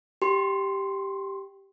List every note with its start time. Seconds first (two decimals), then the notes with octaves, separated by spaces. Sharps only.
0.22 G4 C6